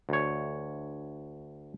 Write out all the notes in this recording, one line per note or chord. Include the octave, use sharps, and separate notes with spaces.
D2 C#5